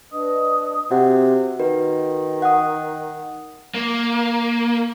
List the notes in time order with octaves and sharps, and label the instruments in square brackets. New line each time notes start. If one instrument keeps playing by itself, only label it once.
[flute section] D4 B4 D#5 D#6
[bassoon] C3 [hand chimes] F#4 F#5
[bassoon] D#3 [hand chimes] F#4 B4
[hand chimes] F#5 D#6
[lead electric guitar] A#3